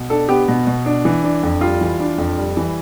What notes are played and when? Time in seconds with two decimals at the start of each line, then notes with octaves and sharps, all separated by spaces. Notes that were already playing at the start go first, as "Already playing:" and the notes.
Already playing: B2
0.10 D4 A4
0.29 B3 G4
0.48 B2
0.67 B2
0.86 D4
1.05 E3
1.24 D4
1.43 F2
1.61 G3 F4
1.81 E3
2.00 D4
2.18 F2
2.37 G3
2.57 E3